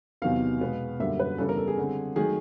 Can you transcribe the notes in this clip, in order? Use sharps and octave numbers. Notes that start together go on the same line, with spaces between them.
E2 C3 D#3 F#3 B3 F5
B2 G#3 B3
F#2 D3 G3 A#3 D4 E5
B4
C#3 E3 G3 B3 D4 A4
A#4
A4
G#4
D3 G3 C4
D#3 F#3 A3 G#4